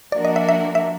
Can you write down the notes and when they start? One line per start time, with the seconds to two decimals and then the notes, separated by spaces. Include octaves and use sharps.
0.12 F3 A#3 D4 F#4 A#4 D5
0.25 D#5
0.36 E5
0.49 E5
0.75 E5